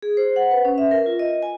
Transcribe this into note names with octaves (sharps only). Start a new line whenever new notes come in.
G#4
C5
F#5
B4
C#4
E5
A#4
F4
D#5
G#5